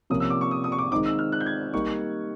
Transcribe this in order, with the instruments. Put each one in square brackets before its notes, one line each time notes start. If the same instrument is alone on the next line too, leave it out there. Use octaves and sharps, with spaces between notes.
[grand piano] C3 F3 A#3 C#4 [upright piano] D#6
[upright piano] E6
D6
C#6
D#6
D#6
C#6
D6
[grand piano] D#3 G#3 C4 D#4 [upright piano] D6
[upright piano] E6
F6
F#6
G6
G#6
[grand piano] G3 A#3 D#4 [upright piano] C#6